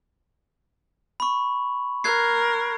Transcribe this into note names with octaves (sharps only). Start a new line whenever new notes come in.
B5 C#6
A#4 F#6 G#6 C7